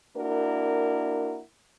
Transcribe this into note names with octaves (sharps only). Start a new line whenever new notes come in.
A#3 D4 E4 F#4 A#4